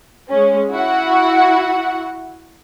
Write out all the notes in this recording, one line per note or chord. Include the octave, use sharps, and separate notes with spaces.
G#3 C#4
E4 F#4 F#5